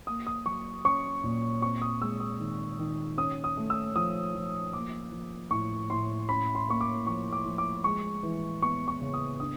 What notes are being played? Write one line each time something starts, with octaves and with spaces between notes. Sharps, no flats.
A#3 D#6
D#6
F#3 C#6
C#4 C#6
A#2
C4 C#6
D#6
G#3 E6
D#6
D#3
D#3
C#4 D#6
D#6
A3
E6
F3 D#6
F3
A#3 D6
F3
A2 C#6
A2 C6
C#4 B5
C6
A#3 C#6
D6
F3 C#6
D6
F3
D6
G#3 C#6
E3
B3 C#6
C#6
C#3
D#6
D4 D#6